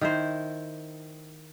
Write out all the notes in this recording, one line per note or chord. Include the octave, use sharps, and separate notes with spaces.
D#3 E4 C5